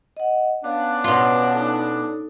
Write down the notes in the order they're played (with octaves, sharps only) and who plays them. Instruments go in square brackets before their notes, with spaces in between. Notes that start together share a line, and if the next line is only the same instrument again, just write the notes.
[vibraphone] D#5 F#5
[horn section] B3 C#4 D4 [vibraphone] F5
[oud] B2 F4 [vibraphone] B4 C#5 F#5
[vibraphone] D#4 A4